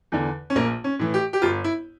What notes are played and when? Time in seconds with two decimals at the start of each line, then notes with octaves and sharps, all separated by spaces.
0.12 E2 D3
0.50 C#4
0.55 A#1 A#3
0.84 C#4
0.99 A2 E3
1.14 G4
1.33 G4
1.42 G1 F4
1.64 E4